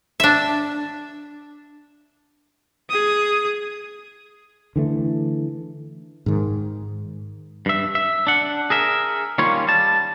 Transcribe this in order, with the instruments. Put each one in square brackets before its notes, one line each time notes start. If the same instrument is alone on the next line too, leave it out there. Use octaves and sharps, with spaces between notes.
[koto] D4 E5
[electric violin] G#4 D#6
[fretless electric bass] D3 E3 A3
G#2 D#3
[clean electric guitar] G2 E5
E5
D4 F#5
G#4 A#4 E5
D#3 G3 A#3 C#4 F4 C#5
G3 A5